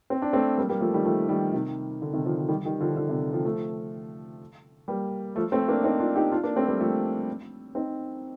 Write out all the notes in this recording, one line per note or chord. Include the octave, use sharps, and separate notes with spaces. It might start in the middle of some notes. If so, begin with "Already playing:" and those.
C4
D4
A3 C4
G3 A#3
G3 A#3
F3 A3
D#3 G3
F3 A3
D#3 G3
C3 D#3
D3
C3 D#3
D3 F3
F3
D#3 G3
D#3 G3
D3 F3
D3
C3
D3 F3
F3 A3
G3 A#3
F3 A3
A3 C4
A#3 D4
C4 D#4
D4 F4
D#4 G4
D4 F4
A#3 D4
A3 C4
G3 A#3
F3 A3
C4 D#4